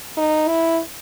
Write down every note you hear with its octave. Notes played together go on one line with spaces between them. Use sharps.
D#4
E4